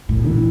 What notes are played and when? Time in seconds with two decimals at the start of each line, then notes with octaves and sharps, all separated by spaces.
0.09 A2
0.26 E3